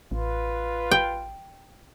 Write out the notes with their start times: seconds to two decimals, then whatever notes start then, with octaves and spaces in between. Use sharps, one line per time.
0.11 A1 F4 B4
0.91 G5